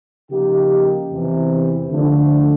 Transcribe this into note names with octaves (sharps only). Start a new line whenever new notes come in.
C#3 F3 A#3 D#4 G4
E2 C3 E3
D3 F3 A3 D4